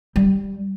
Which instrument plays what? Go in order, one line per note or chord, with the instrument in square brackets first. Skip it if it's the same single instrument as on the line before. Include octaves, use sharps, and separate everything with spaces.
[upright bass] G3